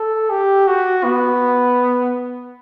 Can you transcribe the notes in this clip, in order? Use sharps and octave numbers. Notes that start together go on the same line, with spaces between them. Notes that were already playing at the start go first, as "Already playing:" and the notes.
Already playing: A4
G4
F#4
B3